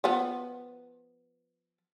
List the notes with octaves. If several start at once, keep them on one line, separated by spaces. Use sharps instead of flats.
F3 B3